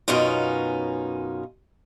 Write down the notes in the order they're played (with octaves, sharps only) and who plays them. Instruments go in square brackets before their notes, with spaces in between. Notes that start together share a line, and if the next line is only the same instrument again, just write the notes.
[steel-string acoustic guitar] F#2 B2 C#4 D#4 F4